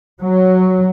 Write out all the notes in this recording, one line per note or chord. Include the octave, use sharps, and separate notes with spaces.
F#3